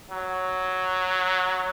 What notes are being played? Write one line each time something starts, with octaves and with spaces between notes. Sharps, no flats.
F#3